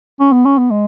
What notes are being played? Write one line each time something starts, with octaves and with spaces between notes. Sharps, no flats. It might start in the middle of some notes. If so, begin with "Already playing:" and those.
C#4
B3
C#4
B3
G#3